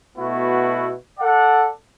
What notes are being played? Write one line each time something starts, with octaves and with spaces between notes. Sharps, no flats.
B2 A3 B3 E4 F#4
A4 D5 F#5